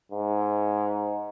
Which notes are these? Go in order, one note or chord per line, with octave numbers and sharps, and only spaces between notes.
G#2